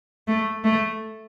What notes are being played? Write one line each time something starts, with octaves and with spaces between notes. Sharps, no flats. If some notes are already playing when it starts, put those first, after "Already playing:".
A3
A3